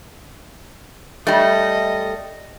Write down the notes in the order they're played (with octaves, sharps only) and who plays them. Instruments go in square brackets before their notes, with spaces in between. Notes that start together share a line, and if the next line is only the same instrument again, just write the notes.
[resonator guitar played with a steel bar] G3 A3 [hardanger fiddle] D#5